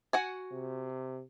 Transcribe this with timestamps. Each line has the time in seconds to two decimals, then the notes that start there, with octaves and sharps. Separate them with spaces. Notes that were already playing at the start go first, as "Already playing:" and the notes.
0.13 F#4 F#5 G#5
0.52 C3